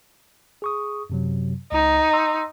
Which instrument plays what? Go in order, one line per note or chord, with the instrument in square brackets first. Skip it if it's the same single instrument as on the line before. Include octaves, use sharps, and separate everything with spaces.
[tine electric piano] G#4 C#6 D#6
F#2 C3 F#3
[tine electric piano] C#2 [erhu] D#4
[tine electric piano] C6 E6